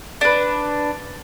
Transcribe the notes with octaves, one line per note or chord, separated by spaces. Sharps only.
D4 B4